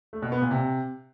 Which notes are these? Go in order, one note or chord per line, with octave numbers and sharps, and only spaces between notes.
A3
B2
B3
A#2
C3